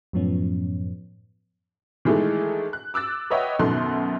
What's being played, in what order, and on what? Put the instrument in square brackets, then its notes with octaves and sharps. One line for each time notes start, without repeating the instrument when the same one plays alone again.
[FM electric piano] F#2 A2 F3 B3 C#4
[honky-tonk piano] D#3 E3 G#3 A3 D#4 A4
F#6
D6 E6 F#6 A6
B4 C#5 D#5 E5 F#5 G5
F#2 B2 D#3 A4 C6 F#6